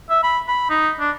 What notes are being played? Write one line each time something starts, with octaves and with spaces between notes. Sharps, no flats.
E5
B5
B5
D#4
D4